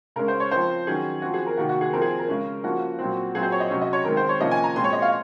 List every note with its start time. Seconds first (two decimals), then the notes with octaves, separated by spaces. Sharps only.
0.16 C#3 G#3 C#4 A#4
0.28 C5
0.40 C#5
0.51 F3 C4 C5
0.87 D#3 F#3 C#4 G#4
1.22 F3 C4 F#4
1.34 G#4
1.46 A#4
1.57 C3 D#3 A#3 F#4
1.69 F#4
1.81 G#4
1.93 F3 C4 A#4
2.02 G#4
2.19 A#4
2.28 C#3 G#3 C#4
2.64 F3 A#3 C#4 F#4
2.99 A#2 F#3 C4
3.34 A#2 F#3 C4 G#4
3.43 C5
3.52 C#5
3.60 D#5
3.70 C3 F#3 C#4
3.82 D#5
3.93 C#5
4.05 D#3 G#3 C4 A#4
4.17 C5
4.29 C#5
4.40 C3 F3 A#3 C#4 D#5
4.51 G#5
4.64 A#5
4.75 A#2 G#3 C4 C6
4.84 C#5
4.93 D#5
5.02 F5